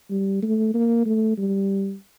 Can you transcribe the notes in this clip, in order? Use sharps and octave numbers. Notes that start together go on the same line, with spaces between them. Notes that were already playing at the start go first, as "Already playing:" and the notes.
G3
A3
A#3
A3
G3